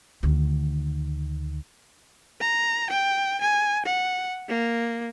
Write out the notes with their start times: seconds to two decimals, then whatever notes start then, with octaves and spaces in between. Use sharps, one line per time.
0.23 D2 D#3
2.41 A#5
2.90 G5
3.41 G#5
3.86 F#5
4.49 A#3